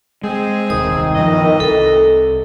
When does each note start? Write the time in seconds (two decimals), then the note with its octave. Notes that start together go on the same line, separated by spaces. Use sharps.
0.23 G#3 C4 G#4
0.70 D#1 C2 D#3 D#6
1.15 G2 A#2 E3 F3 D#5
1.60 C2 A4